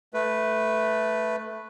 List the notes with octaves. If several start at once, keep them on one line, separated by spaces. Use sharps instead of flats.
A3 B4